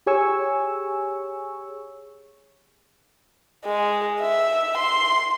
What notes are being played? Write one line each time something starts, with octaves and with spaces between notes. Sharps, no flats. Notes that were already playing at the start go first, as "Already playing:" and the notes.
G4 G#4 C#5 G#5 C#6 E6
G#3
E5
C6